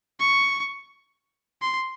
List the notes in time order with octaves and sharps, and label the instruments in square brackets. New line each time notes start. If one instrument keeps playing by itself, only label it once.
[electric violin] C#6
C6